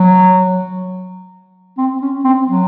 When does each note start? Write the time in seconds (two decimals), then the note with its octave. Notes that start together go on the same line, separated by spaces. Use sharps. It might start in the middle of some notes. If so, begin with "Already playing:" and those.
Already playing: F#3
1.78 C4
2.02 C#4
2.24 C4
2.48 F#3